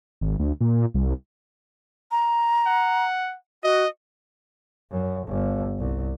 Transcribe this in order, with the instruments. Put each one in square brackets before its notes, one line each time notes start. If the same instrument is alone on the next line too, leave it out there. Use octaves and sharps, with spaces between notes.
[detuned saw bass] G#1
D2
A#2
C2
[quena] A#5
[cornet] F#5
[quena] F#4 [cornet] D#5
[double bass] F#2
G1
C2